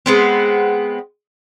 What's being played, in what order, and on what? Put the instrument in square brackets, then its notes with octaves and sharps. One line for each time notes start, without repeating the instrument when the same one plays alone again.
[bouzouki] G#3 B3 C4